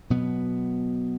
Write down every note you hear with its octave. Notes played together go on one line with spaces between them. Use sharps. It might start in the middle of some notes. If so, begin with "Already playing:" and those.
B2 F#3 B3